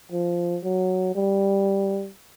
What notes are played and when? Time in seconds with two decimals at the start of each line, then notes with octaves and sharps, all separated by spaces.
0.12 F3
0.64 F#3
1.15 G3